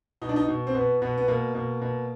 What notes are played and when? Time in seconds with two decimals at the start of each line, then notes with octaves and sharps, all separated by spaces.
0.22 B2 D#4
0.29 D4
0.36 D#4
0.48 B2
0.67 C4
0.75 B2 B3
1.02 B2 B3
1.17 B3
1.28 B2 A#3
1.55 B2
1.82 B2